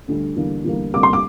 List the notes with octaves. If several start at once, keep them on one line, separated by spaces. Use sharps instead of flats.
D2 D3 G3
E2 D3 G3 A#3
E2 D3 G3 A#3
D2 C3 G3 A#3 D6
C6
D6